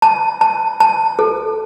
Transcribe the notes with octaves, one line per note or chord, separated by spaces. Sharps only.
A5
A5
A5
A4